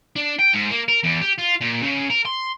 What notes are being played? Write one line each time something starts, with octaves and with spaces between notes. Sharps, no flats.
D4
G5
G#2
A#3
A#4
E2
G4
F4
A#2
C#3
A#4
C6